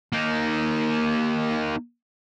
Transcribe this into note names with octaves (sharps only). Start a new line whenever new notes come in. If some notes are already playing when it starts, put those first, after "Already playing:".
A#3 D#4